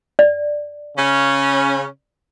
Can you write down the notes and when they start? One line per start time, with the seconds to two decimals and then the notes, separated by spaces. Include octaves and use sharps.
0.19 D5
0.97 C#3 C#4